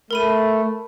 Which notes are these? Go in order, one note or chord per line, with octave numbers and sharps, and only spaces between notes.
A3 A#4 B5 D#7